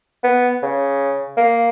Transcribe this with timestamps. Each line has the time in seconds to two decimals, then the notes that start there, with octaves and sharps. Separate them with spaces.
0.24 B3
0.63 C#3
1.37 A#3